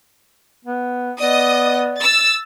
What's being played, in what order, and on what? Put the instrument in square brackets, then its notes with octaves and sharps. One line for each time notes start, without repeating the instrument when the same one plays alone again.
[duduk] B3
[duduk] B3 [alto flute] D5 [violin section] D#5 D#6
[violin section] E6 A6